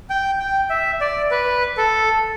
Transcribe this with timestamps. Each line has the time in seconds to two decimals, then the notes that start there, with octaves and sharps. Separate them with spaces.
0.10 G5
0.40 G5
0.70 E5
1.01 D5
1.31 B4
1.77 A4